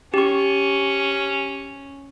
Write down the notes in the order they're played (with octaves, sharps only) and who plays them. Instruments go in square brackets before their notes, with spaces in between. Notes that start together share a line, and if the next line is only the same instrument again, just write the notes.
[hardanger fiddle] C#4 [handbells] G4 C#6